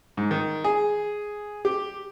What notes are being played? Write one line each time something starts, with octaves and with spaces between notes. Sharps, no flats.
G#2
D#3
G#4
G4